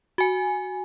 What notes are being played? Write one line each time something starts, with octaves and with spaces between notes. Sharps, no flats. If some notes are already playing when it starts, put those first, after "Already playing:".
F#4 G#5